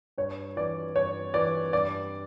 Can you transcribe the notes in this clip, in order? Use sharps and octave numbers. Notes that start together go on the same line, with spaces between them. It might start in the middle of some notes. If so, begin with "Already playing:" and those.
G2 C#5
E3 D5
G2 C#5
E3 D5
G2 D5